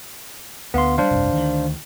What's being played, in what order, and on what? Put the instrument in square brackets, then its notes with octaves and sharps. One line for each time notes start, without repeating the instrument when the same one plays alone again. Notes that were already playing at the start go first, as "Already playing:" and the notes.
[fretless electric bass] D2 [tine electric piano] B3 F5 C6
[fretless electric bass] D#3 G3 [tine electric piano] D4 C5 F5
[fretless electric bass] F1 C2 G2
D2 D#3